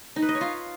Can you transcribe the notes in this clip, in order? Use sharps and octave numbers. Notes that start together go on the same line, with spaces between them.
D#4
B4
D#5
C#5
F4